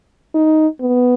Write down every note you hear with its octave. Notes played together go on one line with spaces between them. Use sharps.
D#4
B3